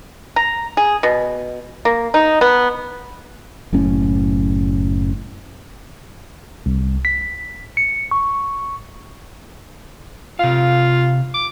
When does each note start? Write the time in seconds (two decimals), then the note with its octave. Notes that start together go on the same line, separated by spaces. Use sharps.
0.36 A#5
0.77 G#4
1.03 B2
1.85 A#3
2.14 D#4
2.41 B3
3.72 F#1 F#2 A2 C#4
6.66 C2
7.05 B6
7.77 C#7
8.11 C#6
10.39 C3 F4 F5
11.34 D6